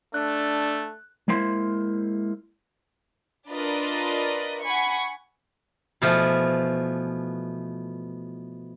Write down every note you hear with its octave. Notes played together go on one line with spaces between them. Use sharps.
A3 D4 F#6
G#3 A#3 E4 C5 C6
D4 F4 A#4 B4 D5 D#5
F#5 G#5 B5 C#6
B2 E3 F3 A3